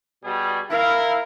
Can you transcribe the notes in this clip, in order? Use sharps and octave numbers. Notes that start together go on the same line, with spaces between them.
B2 G3 G#4
E4 A#4 F5